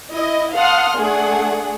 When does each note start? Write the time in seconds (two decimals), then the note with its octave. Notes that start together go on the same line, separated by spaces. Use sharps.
0.13 E4 D#5
0.55 F5 F#5 A5 C6 D#6 F6
0.97 A3 D4 G#4 F#5